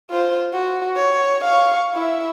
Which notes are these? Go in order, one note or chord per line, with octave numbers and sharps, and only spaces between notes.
F4 C5
F#4
C#5
F5 C#6
E4 E5